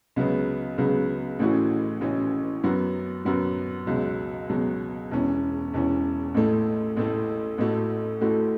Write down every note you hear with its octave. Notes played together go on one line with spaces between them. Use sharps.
C#2 C#3 F#3 B3
C#2 C#3 F#3 B3
A1 A2 E3 C#4 F#4
A1 A2 E3 C#4 F#4
F#2 F#3 B3 F#4
F#2 F#3 B3 F#4
C#2 B2 F#3
C#2 B2 F#3
E1 E2 E3 C#4
E1 E2 E3 C#4
A1 A2 A3
A1 A2 A3
A1 A2 A3 F#4
A1 A2 A3 F#4